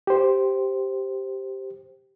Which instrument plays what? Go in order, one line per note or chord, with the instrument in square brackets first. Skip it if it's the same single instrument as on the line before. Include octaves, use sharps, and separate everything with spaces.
[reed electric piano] G4 C5